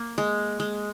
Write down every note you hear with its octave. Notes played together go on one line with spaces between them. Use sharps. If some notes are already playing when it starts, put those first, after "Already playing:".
Already playing: A#3
G#3
G#3